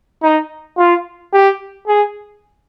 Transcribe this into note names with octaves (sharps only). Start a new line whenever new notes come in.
D#4
F4
G4
G#4